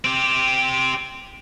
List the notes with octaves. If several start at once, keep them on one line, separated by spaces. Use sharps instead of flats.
C4 G4